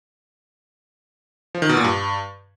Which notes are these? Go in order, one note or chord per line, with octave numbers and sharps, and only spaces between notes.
F3
D#3
B2
A#2
G2